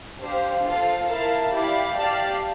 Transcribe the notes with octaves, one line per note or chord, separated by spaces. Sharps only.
D4 G4 C5 F5
F4 A4 C5 F5
E4 A#4 F5 A5
E4 G4 D5 F5
G4 D5 F5 A5